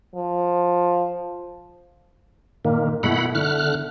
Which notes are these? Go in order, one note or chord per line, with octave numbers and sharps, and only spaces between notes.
F3
A#2 D#3 A#3
B2 A3 E4 F#5 B5
D3 E4 F6 F#6